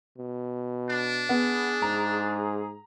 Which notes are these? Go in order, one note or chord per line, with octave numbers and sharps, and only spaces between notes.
B2
D4
B3 G#4
G#2 A#5